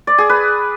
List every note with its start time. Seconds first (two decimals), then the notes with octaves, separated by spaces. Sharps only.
0.07 D5
0.18 G#4
0.29 B4